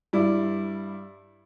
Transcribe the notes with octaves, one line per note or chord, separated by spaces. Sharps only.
G2 E4 D5